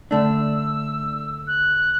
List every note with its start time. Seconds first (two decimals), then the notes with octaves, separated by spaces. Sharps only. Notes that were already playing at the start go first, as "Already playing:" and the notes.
0.11 D3 A3 D4 E6
1.47 F#6